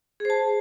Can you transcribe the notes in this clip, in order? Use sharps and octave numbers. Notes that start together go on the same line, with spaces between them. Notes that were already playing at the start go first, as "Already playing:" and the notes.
G#4 C5 A5